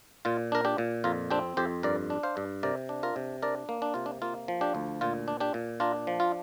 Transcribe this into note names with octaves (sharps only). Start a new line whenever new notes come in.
A#2 F4
D4 A#4
D4 G4
A#2
F2 F4 A#4
C4 D4 G4
F2 G4 C5
G2 A#4 D5
D4
C5 F5
G2
C3 A#4 D5
D4
F4 A#4
C3
D4 A#4 D5
A#3
D4
C3 F4
D4
A#3 F4
F3
D4 G4
D2
A#2 F4
D4
D4 G4
A#2
D4 F4 A#4
F3
F4